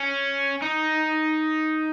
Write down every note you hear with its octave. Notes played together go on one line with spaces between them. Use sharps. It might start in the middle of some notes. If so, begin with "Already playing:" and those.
Already playing: C#4
D#4